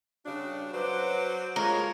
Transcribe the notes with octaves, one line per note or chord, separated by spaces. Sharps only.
G2 C#3 D4 F#4
F#3 C#4 B4 C5 F#5 D6
A2 G#3 A#3 F4 A#4 C#5